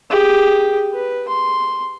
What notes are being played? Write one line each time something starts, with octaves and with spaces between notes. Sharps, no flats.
G4 G#4
B4
C6